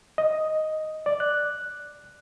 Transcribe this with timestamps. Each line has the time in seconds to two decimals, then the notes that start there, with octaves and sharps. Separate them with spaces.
0.18 D#5
1.06 D5
1.20 F#6